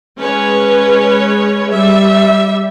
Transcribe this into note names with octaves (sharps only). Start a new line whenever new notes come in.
G#3 C#4 B4 C#5
G3 E5